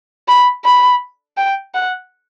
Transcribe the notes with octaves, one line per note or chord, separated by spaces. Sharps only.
B5
B5
G5
F#5